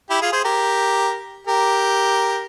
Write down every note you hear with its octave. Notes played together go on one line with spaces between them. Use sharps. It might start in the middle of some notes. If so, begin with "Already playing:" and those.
E4 G4
F4 G#4
G#4 C5
G4 A#4
G4 A#4